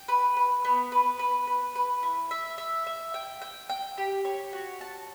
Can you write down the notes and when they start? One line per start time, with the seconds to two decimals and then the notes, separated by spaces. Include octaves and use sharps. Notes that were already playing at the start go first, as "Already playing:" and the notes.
Already playing: G5
0.08 B4
0.37 B4
0.65 B3
0.92 B4
1.19 B4
1.47 B4
1.75 B4
2.03 E4
2.31 E5
2.58 E5
2.87 E5
3.14 G5
3.42 G5
3.69 G5
3.98 G4
4.25 C#5
4.53 F#4
4.81 A5